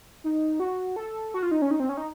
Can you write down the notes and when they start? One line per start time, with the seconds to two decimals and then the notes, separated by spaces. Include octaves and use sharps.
0.24 D#4
0.60 F#4
0.96 A4
1.34 F#4
1.43 F4
1.51 D#4
1.62 C#4
1.71 D#4
1.80 C4
1.89 C#4
1.97 D#4